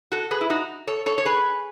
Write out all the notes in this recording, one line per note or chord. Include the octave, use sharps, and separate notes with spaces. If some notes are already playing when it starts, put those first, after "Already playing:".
F#4 A4
G#4 B4
E4
D#4 F#4
A4 C#5
A4 C#5
C#5
G#4 B4